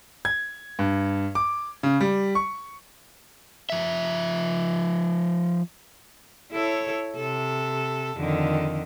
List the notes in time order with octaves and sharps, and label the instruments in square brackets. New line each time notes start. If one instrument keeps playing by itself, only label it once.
[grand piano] G#6
G2
D6
C#3
G3
C#6
[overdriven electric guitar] F3 E5
[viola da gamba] E4 A4 C#5
C3 A4
F2 D3 D#3